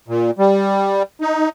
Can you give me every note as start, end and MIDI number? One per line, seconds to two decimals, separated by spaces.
0.08 0.31 46
0.39 1.03 55
1.21 1.49 63